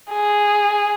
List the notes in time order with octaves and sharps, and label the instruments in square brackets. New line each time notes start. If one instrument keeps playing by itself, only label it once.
[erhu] G#4